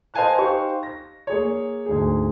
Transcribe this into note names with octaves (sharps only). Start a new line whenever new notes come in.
C5 D#5 F5 G#5 A5 F#6
D#4 G4 C5 F5 C#6
A#6
A#3 G#4 C#5
D2 G#2 G#4